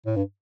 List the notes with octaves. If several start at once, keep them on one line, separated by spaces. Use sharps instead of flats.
A2
G2